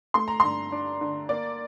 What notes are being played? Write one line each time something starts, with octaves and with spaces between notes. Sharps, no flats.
A3 C6
A#5
G2 C6
D4
D3
A#3 D5